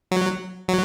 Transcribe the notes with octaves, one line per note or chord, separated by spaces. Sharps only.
F#3
F#3